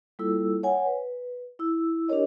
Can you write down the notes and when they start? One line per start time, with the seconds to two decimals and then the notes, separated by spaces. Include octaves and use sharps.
0.19 G3 A#3 E4 F4 A4 E6
0.63 C#5 F#5 G#5
0.86 B4
1.59 E4 E6
2.09 D4 G4 A#4 C#5 D#5